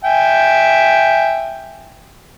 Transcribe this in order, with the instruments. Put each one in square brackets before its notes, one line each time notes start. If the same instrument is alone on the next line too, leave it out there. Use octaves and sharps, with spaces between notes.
[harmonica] E5 G5 G#5